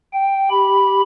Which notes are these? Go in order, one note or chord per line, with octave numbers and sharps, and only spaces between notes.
G5
G4 B5